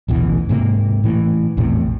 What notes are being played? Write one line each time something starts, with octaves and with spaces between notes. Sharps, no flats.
A1 D2 B2 E3
G#2 C3 A#3
A2 E3
A#1 E2 A2 C3